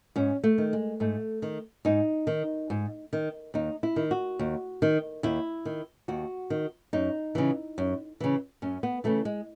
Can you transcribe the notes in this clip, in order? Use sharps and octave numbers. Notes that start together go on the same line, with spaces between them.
G#2 C#4
A3
D#3
G#3
G#2 A3
D#3
G#2 D#4
D#3
G#2
D#3
D#2 D#4
E4
D#3
F#4
D#2
D#3
D#2 E4
D#3
D#2 F#4
D#3
F#2 D#4
C#3 E3
F#2
C#3 E3
F#2 C#4
B3
C#3 E3 A3
G#3